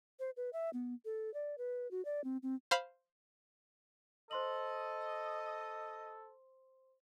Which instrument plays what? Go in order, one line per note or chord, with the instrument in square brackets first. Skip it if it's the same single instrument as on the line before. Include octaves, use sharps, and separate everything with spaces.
[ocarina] C5
B4
E5
B3
A4
D5
B4
F#4
D5
C4
C4
[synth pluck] C5 F5 B5 C6
[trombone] A4 [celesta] C5 C6 F#7 [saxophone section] D#5